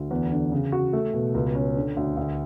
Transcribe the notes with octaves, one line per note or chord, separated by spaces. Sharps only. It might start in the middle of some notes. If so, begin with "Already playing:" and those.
Already playing: D2
E2
D3
C#3
F#4
A3
B2
C#2
C#4
D3
D2
D2